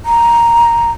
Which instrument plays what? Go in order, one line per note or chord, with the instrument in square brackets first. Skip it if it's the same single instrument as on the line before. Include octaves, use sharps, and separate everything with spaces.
[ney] A#5